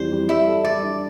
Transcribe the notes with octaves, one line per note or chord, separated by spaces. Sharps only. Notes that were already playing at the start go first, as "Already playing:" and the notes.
Already playing: F2 E3 G3 C5
G3
G3 E4 E5
A4
G3 D5
D4